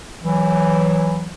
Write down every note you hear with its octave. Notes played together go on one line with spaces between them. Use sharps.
E3 F#3